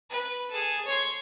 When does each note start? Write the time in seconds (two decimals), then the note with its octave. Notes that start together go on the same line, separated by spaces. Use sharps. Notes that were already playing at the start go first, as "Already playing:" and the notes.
0.10 B4
0.51 G#4 A4
0.85 C#5 C6